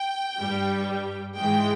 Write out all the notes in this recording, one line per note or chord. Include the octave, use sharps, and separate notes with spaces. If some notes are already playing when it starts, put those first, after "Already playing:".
Already playing: G5
G2 G3
G#2 E3 G#3 G5